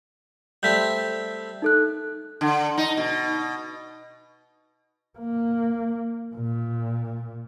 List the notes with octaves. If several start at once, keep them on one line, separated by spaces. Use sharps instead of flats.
G3 A3 C4 G6 B6
D#4 A4 F#6
D3
D#4
B2
A#3
A#2